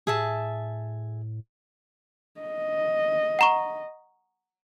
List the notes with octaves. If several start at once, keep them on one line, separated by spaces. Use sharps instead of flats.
A2 G#4 E5 A5
D#5
F#5 A#5 C#6